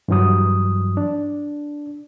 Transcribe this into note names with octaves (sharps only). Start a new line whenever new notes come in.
G2 E3 F#3 D#6
D4